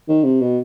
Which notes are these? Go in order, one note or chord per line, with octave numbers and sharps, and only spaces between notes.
D#3
C3
B2